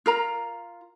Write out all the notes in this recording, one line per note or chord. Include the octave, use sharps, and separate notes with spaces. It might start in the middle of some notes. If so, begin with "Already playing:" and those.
F4 A#4 A#5